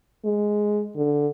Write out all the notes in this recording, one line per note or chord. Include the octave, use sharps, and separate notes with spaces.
G#3
D3